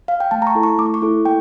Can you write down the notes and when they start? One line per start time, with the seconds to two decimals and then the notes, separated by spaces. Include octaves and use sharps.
0.08 F5
0.20 G5
0.31 A3 A5
0.42 A#5
0.47 C#6
0.55 E4 A4
0.63 C#6
0.79 A3 D6
0.94 C#6
1.02 E4 A4
1.25 A#3 G5